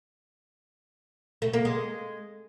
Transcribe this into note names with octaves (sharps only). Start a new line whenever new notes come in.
A3
A#3
G#3